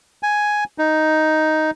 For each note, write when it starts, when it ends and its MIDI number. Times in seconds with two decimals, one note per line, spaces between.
0.23 0.64 80
0.78 1.71 63